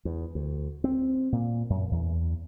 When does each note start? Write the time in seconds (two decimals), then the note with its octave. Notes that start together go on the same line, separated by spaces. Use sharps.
0.05 E2
0.35 D2
0.84 C4
1.32 A#2
1.70 F#2
1.91 E2